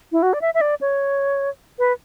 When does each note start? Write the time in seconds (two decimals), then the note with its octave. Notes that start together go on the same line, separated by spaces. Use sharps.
0.12 E4
0.23 F#4
0.33 D5
0.41 E5
0.54 E5
0.61 D5
0.81 C#5
1.79 B4